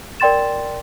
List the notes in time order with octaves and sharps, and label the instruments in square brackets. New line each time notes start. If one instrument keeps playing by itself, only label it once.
[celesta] A#4 D5 G5 C6 A6 E7